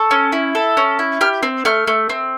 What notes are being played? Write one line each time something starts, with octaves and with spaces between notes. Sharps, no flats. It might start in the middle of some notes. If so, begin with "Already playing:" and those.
Already playing: A4 C#6
C#4
E4
A4
C#4
E4
G4 F6
C4
A3 F6
A3
C4